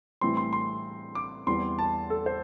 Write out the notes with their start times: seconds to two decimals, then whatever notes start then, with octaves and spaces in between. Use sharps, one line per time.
0.21 A2 E3 G3 C4 C6
0.37 C6
0.53 C6
1.15 D6
1.47 E2 E3 G3 C4 C6
1.79 A5
2.10 A4
2.26 C5